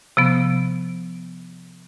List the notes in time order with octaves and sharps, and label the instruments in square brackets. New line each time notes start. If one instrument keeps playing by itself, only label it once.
[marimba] C3 F3 B3